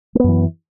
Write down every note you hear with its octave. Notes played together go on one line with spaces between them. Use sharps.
F#2 E3 A3 B3